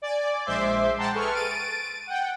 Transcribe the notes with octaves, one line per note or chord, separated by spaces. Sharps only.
D5 G#5
A#1 G#3 C5 E5 C6 D6
C5 F#5 G5 A5 A#5 C6
G#4 A4 B4 C#6 F6
A6 D7 D#7
F#5 G5